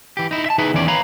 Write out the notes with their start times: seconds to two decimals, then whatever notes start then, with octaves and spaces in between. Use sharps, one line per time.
0.17 E3 G4
0.31 D#4 E4
0.46 E5 A5
0.58 D#4 E4 G#4 B4 E5
0.73 E2 D#3 E3 C#4 D5
0.88 B4 C#5 F5 A#5 B5